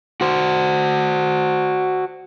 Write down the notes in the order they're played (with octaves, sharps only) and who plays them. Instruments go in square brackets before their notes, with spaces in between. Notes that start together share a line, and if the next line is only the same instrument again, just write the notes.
[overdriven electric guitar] F#4 C5